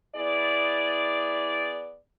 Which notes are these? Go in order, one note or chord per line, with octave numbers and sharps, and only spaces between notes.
B3 E4 G#4 D5